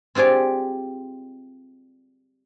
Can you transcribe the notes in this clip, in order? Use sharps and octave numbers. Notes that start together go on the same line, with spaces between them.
C4 F4 G4 G#4 D5